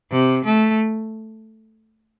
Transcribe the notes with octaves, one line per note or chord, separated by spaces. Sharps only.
C3
A3